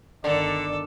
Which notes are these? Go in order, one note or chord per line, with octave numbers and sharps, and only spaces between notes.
G1 D3 D#3 A4 D5